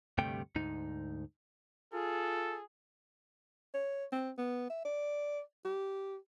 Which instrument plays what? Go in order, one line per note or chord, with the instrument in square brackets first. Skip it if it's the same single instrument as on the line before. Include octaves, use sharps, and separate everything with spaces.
[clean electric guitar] D2 G2 C3 G3 A3 G5
D2 G#2 D#4
[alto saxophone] F4 [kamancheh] G#4 [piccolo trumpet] A4
[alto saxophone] C#5
C4
B3
E5
D5
G4